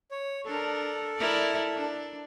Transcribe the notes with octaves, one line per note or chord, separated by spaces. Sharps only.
C#5
D4 A4 A#4
E4 A#4 D5
D4